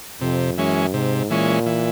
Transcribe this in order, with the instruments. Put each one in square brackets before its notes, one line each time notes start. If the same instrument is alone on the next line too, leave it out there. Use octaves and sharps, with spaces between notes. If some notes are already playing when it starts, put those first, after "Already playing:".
[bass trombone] F2 [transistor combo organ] C3
[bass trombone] F#2 [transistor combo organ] E3 G#3 C#4
[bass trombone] G#2 [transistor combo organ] C3
[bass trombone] A#2 [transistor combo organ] E3 G#3 C#4
[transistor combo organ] E3